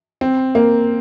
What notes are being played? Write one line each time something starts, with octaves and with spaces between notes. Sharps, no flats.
C4
A#3